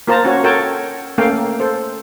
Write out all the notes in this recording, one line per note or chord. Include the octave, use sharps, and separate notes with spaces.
A#3 F4 A#4 C5 A5 A#5
C#4 F#4 C#5
F#4 A4 A#4 C#5 G5 A5
A3 A#3 C#4 A4 F5 G5
A4 C5